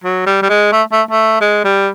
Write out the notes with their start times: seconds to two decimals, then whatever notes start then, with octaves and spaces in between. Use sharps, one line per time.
0.04 F#3
0.26 G3
0.42 G3
0.49 G#3
0.72 A3
0.92 A3
1.11 A3
1.41 G#3
1.64 G3